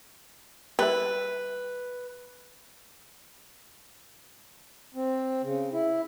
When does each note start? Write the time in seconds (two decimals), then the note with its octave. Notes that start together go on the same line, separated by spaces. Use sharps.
0.79 G3 E4 B4
4.94 C4
5.42 C#3
5.72 E4